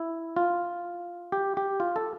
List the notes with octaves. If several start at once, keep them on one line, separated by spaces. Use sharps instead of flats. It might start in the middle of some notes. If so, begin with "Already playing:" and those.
Already playing: E4
F4
G4
G4
F4
A4